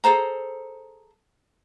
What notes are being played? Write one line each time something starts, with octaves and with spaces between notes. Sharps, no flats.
G#4 A4 C5 A#5